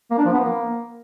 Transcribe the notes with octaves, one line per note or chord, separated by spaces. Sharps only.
A#3
D4
F3
B3
A#3